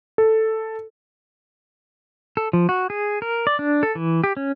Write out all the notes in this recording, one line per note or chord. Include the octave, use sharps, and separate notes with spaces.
A4
A4
F3
F#4
G#4
A#4
D5
D4
A4
E3
G4
C#4